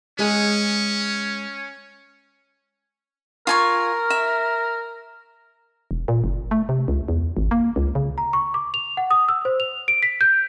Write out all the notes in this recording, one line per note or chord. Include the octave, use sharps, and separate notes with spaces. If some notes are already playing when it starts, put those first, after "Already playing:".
G#3 C#4 G#4
F4 A#4 G#5 C#6
E5
E1
A#2
F#1
A3
C3
C#2
E2
G#1
A#3
C#2
C#3
A#5
C#6
D6
F7
F#5
D#6
E6
C5
F7
D7
B6
G6